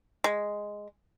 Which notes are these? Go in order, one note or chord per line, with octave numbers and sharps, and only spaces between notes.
G#3